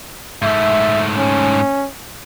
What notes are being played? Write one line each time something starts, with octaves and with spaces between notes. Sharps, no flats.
G#2 A3 E5
C#4